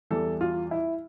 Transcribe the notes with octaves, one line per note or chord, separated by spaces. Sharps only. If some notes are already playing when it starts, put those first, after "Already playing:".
E2 E3 G3 A4
F4
E4